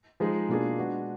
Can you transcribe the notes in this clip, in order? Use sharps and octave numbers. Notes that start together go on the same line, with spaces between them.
F3 G#3 D#4 G#4
B2 A#3 D4 F4 G#4
G#3 B3 D4 F#4